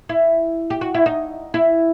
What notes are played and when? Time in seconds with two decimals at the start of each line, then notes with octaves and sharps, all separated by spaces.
0.09 E4
0.70 G4
0.81 F#4
0.94 E4
1.06 D#4
1.54 E4